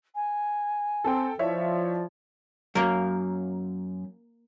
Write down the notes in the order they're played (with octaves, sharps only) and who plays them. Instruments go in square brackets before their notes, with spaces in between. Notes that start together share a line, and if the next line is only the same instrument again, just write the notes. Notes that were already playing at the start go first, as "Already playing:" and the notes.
[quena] G#5
[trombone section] C4 [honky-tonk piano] A4 G5
[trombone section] F3 [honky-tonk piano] E4 C#5 E5 [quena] D5
[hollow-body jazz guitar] F#2 [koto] A#3 A#4